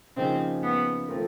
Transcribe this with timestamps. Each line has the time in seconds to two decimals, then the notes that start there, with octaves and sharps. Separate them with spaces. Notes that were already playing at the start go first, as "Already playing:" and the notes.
0.16 C#3 F3 A#3 C4 D#4 G#4
0.63 B3
1.09 F3 A3 C4 F4 A#4